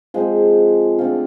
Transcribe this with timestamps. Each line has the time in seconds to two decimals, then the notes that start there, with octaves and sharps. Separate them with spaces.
0.14 F3 G#3 C4
0.99 D3 A3 C4 F4